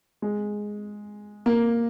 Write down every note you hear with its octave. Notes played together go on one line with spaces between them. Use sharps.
G#3
A#3